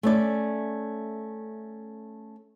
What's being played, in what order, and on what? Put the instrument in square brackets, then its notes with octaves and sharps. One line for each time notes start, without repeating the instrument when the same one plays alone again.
[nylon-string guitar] A3 C#4 D5